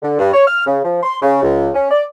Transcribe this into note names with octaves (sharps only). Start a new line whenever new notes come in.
D3
G2
C#5
F6
C#3
F3
C6
C#3
C#2
C#4
D5